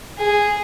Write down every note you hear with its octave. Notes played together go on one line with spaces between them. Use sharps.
G#4